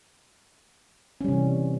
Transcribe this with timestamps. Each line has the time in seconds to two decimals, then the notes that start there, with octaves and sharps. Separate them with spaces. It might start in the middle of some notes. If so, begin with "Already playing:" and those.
1.21 C#4
1.24 G3
1.28 C3
1.32 E3